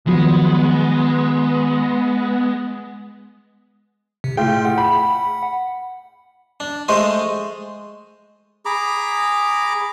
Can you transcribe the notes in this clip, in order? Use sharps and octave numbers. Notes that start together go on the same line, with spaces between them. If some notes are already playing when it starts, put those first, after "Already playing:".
D#3 F3 F#3 G#3 B3 F#4
C3
A2 F4 G#4 G5
F#5
B5
D4
G#3 A3 C5 D#5
G#4 A#5 B5 D6